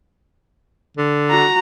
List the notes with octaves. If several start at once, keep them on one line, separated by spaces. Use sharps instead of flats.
D3
F#4 A#5